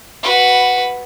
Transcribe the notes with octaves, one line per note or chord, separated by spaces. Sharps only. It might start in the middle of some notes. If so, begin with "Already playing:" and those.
F#4 B4